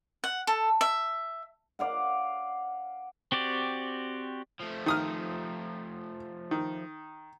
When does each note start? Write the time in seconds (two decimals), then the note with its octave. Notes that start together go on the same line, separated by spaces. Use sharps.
0.24 F#5
0.47 A4
0.81 E5
1.79 D5 F5 F#5
3.32 C4 F#4 G4 D5
4.60 F3 A3
4.86 D#3 D#6 F6
6.51 D#3